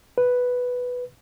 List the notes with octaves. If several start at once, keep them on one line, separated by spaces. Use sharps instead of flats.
B4